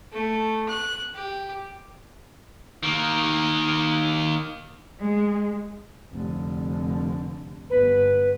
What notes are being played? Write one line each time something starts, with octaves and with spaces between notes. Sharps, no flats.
A3
F#6
G4
D#3 A#3
G#3
F1 D3
G1 B3 B4